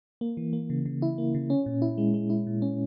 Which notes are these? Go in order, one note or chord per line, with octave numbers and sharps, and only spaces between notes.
A#3
E3
A#3
C#3
C#3
E4
A#3
C#3
C#4
A#2
E4
G#3
G#3
E4
A#2
C#4